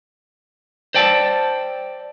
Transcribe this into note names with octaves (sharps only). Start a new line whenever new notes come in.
C5 D5 G5 A5